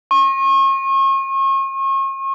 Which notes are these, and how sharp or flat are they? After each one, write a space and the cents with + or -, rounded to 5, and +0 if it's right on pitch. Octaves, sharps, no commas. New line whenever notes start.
C#6 -40